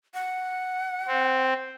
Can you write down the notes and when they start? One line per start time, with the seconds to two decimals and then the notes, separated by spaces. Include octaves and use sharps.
0.14 F#5
1.08 C4